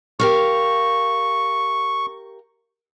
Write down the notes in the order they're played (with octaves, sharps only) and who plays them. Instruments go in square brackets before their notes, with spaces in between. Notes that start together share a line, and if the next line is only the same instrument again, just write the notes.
[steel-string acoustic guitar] G4 A#4 F5 [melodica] C#6